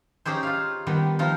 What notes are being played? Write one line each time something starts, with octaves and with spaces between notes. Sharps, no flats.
C#4 D#4 G4 G#4 C5
F4 F5
D#3 G3 B3
F3 D#4 F4